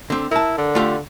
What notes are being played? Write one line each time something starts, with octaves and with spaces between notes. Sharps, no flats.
D3 C4
E4 A#4 A5
D3
A3 F4 G4